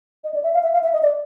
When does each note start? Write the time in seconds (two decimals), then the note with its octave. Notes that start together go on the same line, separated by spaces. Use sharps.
0.24 D#5
0.34 D5
0.43 E5
0.54 F5
0.63 E5
0.73 F5
0.83 E5
0.93 D#5
1.03 D5